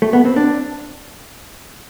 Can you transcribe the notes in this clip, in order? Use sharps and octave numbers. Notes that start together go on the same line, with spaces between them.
A3
B3
C4
D4